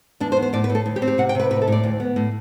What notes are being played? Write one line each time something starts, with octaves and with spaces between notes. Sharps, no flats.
E2 D4
C5
B3
C5
A2 D5
B4
A2
A4
D2
G4
C4
G4
C3 F#5
G5
C3 B4
A2 B4
A4
A2 D5
D2
B3
A2